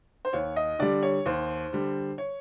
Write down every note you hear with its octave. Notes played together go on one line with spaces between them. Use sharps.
C5
D#2 C#5
D#5
D3 G3 D5
C#5
D#2 C5
D3 G3
C#5